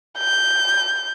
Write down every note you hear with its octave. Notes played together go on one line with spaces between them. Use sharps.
G6